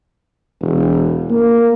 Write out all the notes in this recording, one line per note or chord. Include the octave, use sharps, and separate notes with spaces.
E1
A#3